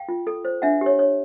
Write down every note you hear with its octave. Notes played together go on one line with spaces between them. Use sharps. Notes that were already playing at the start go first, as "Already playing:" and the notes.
Already playing: F5 G5
F4
A4
C5
D4 E5 F#5
G4 C#5
C#5